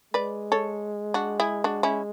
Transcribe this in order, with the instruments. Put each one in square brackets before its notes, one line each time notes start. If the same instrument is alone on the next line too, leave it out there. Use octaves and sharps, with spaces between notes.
[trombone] G#3 [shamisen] B4 D5
[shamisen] A4 C#5
D4 F#4
E4 G#4
D4 F#4
C#4 E4